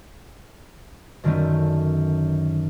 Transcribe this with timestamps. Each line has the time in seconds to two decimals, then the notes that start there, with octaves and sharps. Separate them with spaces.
1.24 F#2 D3 D#3 F#3 A3 C#4